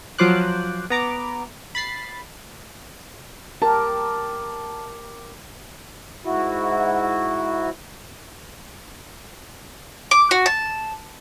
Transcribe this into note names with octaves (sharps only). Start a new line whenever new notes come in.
F3 F#3 F4 C5 D6 F#6
B3 A#5 D6
B5 A6 C7
G4 A#4 A5
G#2 E4 F#4
D6
F#4
A5